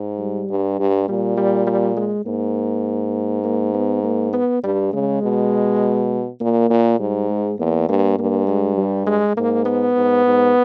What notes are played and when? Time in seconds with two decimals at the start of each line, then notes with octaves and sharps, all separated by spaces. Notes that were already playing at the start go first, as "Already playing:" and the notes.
Already playing: G#2
0.19 G3
0.50 G2
0.79 G2
1.08 A#2 G3
1.38 G3
1.67 G3
1.97 G#3
2.26 G#2 A#3
3.44 A#3
3.74 B3
4.04 A#3
4.33 B3
4.63 G2 G3
4.93 C#3 G#3
5.23 B2
6.41 A#2 A#3
6.70 A#2
6.99 G#2 G3
7.30 G#3
7.58 E2 A#3
7.88 G2 A#3
8.18 G2 A#3
8.48 G#3
8.78 G3
9.07 G#3
9.37 G#2 A#3
9.66 B3
9.95 G#2
10.26 G#2